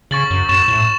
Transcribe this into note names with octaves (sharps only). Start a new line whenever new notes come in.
C#3 C#6 A6 F#7
F#2
F#2 C#6 A6 E7
A2